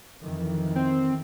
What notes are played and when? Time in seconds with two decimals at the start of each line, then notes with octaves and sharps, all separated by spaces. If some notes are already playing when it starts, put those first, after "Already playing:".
0.21 F2 D#3 E3
0.76 C4